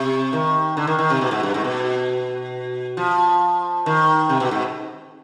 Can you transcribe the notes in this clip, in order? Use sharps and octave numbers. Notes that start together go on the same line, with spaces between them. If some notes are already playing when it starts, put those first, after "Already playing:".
Already playing: C3
D#3
D3
D#3
D#3
C3
B2
G#2
G2
G#2
B2
F3
D#3
C3
B2
G#2